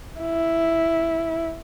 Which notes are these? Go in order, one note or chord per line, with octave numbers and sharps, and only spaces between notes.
E4